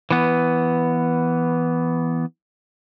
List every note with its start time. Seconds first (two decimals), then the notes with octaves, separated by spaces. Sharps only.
0.11 E3 B3